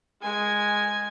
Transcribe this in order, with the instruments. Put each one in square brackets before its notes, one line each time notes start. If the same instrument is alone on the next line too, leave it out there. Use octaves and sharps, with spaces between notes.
[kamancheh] G#3 G#5